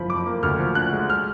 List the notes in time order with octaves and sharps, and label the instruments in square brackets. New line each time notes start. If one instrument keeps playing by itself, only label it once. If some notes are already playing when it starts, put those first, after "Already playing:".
Already playing: [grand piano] F#1 F3 B5
F2 D6
A#3
D2 F6
F3
D3 F#6
G#3
F6